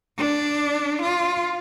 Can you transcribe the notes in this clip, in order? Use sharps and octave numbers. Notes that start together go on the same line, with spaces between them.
D4
F4